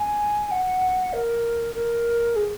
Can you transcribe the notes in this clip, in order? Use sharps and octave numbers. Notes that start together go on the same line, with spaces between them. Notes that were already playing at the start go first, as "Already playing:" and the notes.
Already playing: G#5
F#5
A#4
A#4
G#4